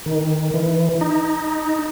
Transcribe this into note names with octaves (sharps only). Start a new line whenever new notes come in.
D#3
E3
D#4